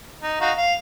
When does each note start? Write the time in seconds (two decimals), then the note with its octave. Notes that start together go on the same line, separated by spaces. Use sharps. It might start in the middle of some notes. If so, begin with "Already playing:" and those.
0.22 D#4
0.41 D#4 F#4 F5
0.57 F5